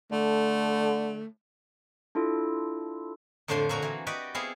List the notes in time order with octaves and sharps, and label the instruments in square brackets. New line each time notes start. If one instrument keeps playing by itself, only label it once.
[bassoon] D3 [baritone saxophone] A3
[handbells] D4 E4 F4 A4
[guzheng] F2 A2 D3 F3 C5 C6
A#2 A#3 F#4 G#5 A#5
E3 A#3
F#4 G4 B4 D5 D#5
B3 C4 E4 G#4 F5